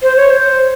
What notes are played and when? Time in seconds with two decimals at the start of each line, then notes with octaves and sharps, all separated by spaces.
0.03 C5
0.16 C#5
0.30 C5